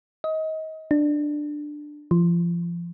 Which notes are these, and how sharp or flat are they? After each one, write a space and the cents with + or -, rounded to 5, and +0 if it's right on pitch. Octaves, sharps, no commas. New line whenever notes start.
D#5 +25
D4 +10
F3 -30